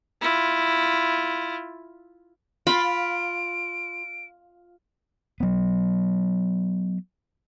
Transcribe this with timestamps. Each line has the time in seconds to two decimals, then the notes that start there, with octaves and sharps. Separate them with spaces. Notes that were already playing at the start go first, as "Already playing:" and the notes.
0.21 E4 F4
2.67 F4 B5 D7
5.40 F#3 B3